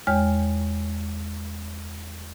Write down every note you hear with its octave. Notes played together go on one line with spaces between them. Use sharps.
E2 G#3 C#5 G5 F6